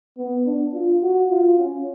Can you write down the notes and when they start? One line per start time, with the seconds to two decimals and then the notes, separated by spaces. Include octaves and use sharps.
0.17 B3
0.46 D4
0.74 F4
1.02 F#4
1.30 F4
1.58 C#4